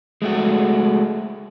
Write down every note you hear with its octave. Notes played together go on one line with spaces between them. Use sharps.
G#3 A3 F#4